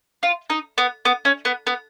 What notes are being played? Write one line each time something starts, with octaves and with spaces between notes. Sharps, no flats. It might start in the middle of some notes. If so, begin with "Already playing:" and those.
F4
D#4
B3
B3
C#4
B3
B3